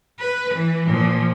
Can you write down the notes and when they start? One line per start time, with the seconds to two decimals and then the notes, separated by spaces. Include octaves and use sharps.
0.19 B4
0.55 E3
0.86 A#2 F3